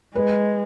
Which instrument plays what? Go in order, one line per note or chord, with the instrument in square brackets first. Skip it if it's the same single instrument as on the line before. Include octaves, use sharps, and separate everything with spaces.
[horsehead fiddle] G#3 [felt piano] B4